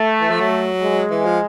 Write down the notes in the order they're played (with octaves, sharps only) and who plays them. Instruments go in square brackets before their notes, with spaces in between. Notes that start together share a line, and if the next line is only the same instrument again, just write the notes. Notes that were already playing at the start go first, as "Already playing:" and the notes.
Already playing: [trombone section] A3
[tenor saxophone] E3
F3
F#3
[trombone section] G#3
[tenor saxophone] E3
F3